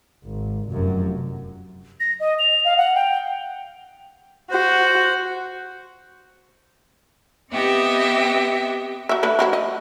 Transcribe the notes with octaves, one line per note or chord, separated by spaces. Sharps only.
G#1
F1 F#2
A#6
D#5
F7
F5
F#5
G5
F#4 C5
B3 C4 G4 D#5 E5 G5
F#3 E5
A3 D4 B4
F3 F#3 E4
D#5